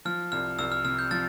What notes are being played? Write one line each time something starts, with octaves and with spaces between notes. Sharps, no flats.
F3 F6
C2 F6
C2 E6
F6
C3 F6
G6
F3 F6 A6